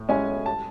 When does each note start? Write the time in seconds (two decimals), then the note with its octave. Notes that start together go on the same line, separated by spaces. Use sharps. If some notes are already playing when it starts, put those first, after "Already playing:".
Already playing: A2
0.09 G#3 C#4 E4 G#5
0.46 A5